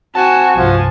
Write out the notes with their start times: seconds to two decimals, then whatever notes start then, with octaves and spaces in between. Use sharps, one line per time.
0.15 C4 F#4 G#5 A5
0.56 C2 G2 F3